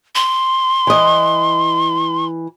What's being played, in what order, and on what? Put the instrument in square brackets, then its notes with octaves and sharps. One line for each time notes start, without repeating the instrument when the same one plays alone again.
[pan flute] C6
[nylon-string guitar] E3 D#5